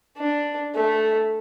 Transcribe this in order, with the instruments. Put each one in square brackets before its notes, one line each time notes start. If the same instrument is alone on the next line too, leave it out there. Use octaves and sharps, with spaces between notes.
[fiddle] D4
A3